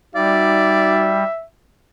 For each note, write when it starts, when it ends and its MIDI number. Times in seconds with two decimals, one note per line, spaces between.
0.16 1.24 55
0.16 1.27 63
0.16 1.27 66
0.16 1.21 74
0.16 1.45 76